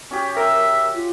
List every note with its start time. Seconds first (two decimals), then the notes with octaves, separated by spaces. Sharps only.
0.11 C#4 F#4 G4
0.37 A#4 E5
0.95 F4